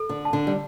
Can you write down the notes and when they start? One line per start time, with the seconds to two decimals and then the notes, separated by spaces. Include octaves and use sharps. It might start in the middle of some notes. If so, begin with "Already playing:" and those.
Already playing: A4
0.09 D3
0.25 A5
0.33 D3
0.47 G3